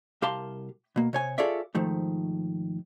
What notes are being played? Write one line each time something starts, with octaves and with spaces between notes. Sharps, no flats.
C2 G4 A#4 F5 A5 C6
B2 A#3
C3 C#5 G#5
F4 G#4 A4 C#5 D5 E5
G#2 D#3 F3 A3